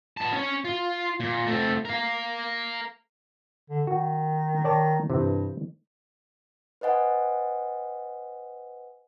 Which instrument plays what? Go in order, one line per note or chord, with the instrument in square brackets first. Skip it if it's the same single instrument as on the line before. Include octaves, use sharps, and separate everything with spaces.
[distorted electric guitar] B3 A5
C#4 C#5
F4
A#2
A3 C4
A#4 F5
[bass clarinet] D3
[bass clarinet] D#3 [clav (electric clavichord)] F#4
[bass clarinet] D#3 [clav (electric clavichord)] C#5 D5 A5
[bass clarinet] G2 [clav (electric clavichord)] C3 E3
[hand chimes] B4 C5 D#5 F#5 G#5